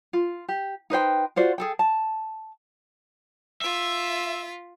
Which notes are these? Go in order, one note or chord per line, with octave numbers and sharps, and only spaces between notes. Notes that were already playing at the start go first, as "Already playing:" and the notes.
F4
G4
D#4 B4 C5 G5
F4 F#4 C5 D5
G#4 A4 G5
A5
F4 E5 B6